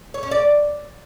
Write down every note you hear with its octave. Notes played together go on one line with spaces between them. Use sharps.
C#5
C#4
D5